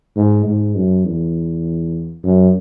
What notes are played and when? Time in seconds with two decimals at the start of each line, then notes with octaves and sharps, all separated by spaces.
0.16 G#2
0.46 G#2
0.76 F#2
1.05 E2
2.24 F#2